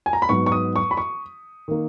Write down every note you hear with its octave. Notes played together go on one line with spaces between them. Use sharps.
G#5
A#5
B5
G#2 F#3 B3 C#6
C#6
D#6
C#6
B5
C#6
D#3 A#3